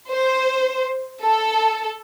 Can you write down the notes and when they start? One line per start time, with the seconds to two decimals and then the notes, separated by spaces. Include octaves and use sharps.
0.11 C5
1.23 A4